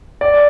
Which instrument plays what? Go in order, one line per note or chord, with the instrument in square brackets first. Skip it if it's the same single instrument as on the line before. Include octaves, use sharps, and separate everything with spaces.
[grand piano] D5